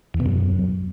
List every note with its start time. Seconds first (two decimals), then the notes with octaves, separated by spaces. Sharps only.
0.14 E2
0.20 B2
0.26 F#2